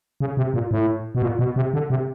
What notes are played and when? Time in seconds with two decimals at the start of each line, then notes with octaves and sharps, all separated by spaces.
0.20 C#3
0.37 C3
0.54 A#2
0.71 A2
1.15 B2
1.22 A#2
1.39 B2
1.56 C3
1.74 D3
1.90 C3